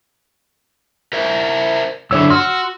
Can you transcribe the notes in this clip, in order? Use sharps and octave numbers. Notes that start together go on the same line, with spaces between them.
A#4 C5 E5
F#2 D3 E4 C#5 E6
F#4 C6 E6 F6